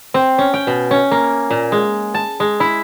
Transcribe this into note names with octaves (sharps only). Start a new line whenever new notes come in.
C4
C#4
G5
B2
C#4
A#3
A#2
G#3
A5
G#3
E4